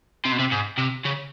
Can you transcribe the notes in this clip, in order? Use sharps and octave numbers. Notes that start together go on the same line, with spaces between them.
C3
B2
C3
G#2
C3
C#3